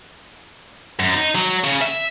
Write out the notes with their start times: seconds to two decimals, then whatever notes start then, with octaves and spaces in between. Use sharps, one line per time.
1.00 F#2
1.15 D#4
1.35 F#3
1.64 C#3
1.82 E5